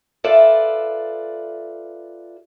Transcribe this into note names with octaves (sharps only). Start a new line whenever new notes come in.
F4 A4 B4 D5 E5